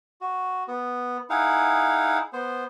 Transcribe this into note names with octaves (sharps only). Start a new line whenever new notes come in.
F#4
B3
D#4 E4 G#4 F5 F#5
B3 C5